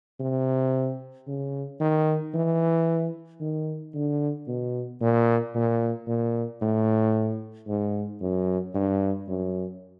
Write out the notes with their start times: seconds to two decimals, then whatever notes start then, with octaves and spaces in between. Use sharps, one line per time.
0.20 C3
1.27 C#3
1.80 D#3
2.34 E3
3.41 D#3
3.94 D3
4.47 B2
5.01 A#2
5.55 A#2
6.07 A#2
6.62 A2
7.68 G#2
8.21 F#2
8.74 G2
9.28 F#2